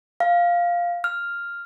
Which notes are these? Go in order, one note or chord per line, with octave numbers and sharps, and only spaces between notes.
F5
F6